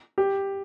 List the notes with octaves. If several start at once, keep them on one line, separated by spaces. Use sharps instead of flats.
G4